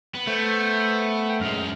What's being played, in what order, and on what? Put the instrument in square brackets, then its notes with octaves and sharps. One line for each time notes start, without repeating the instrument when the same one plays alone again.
[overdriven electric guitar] B3
[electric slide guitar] A3 [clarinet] C5
[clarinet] G5
[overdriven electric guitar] F#2 G#3 [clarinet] F6